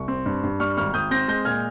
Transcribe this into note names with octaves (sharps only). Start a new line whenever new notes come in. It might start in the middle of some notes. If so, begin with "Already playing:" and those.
Already playing: C2 C#6
C4
G2
G2
G3 C#6 F6
G#1 C#6 F6
G#1 D#6 G6
C4 G6 A#6
G#3 G6 A#6
A#2 F6 G#6